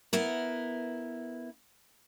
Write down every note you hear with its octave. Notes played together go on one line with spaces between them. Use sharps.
B3 E4 A#4